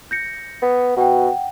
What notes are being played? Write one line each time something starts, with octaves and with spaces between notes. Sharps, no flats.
G6 A#6 C#7
B3
B2 F#5 G5